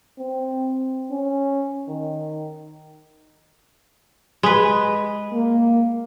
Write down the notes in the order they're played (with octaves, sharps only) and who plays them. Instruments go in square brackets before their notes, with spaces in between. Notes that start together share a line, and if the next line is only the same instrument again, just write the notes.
[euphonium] C4
C#4
D#3
[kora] G#3 B4
[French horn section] A#3